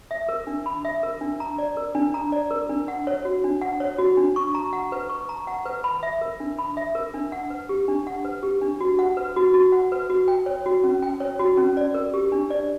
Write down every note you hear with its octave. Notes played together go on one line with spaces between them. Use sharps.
E5
A#4
D4
B5
E5
A#4
D4
A#5
D5
A#4
D4
A#5
D5
A#4
D4
F#5
C#5
F#4
D4
F#5
C#5
F#4
D4
C#6
A#5
F#5
B4
C#6
A#5
F#5
B4
B5
E5
A#4
D4
B5
E5
A#4
D4
F#5
B4
G4
D4
F#5
B4
G4
D4
F#4
F#5
B4
F#4
F#4
F#5
B4
F#4
G5
C#5
F#4
C#4
G5
C#5
F#4
C#4
D5
A#4
G4
D4
D5